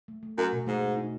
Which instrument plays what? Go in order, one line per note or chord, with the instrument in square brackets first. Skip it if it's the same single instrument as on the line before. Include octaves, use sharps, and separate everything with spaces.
[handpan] A3
A3
[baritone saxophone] F#2 [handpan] F#4
[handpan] B2
[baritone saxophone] G#2 [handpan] A3
[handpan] A3
D#4